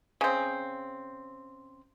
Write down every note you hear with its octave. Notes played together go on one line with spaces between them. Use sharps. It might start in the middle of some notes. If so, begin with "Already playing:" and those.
C#3 C4